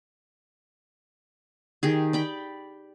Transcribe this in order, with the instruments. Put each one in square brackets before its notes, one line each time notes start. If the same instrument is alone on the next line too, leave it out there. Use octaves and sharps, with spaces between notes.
[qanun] D#3 G4 G#4
D5 G5 B5